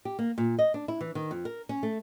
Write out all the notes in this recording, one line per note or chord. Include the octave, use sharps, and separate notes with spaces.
G4
A#3
A#2
D#5
D4
E4
E3
D#3
F2
A#4
C#4
A3